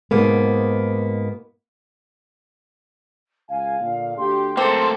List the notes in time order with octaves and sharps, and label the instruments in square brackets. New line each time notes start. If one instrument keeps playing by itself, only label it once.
[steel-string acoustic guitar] G#2 B2 A#3 B3
[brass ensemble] C#2 G#5 [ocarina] F5
[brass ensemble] A#2 D3
[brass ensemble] D2 D4 G4 [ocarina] C6
[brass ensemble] F#1 A3 [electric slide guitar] A#3 A4 [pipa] C4